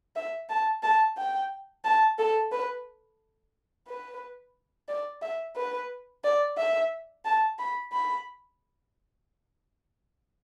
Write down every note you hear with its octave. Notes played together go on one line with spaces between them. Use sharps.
E5
A5
A5
G5
A5
A4
B4
B4
D5
E5
B4
D5
E5
A5
B5
B5